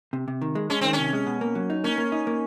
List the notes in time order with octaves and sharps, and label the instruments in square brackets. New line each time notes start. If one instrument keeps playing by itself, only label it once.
[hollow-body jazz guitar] C3
C3
D#3
G#3
[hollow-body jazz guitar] G#3 [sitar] C#4
[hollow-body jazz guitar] D#3 [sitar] C4
[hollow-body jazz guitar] C3 [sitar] C#4
[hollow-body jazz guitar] G#3
B2
A#3
F#3
D#4
[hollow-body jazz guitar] A#3 [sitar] C#4
[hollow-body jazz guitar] A#3
D#4
A#3